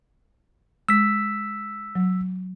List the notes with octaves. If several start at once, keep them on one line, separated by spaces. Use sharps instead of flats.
G#3 E6 B6
F#3